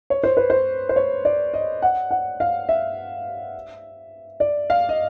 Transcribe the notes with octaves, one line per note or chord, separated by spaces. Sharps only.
C#5
C5
B4
C5
C5
C#5
D5
D#5
F#5
F#5
F5
E5
D5
F5
D#5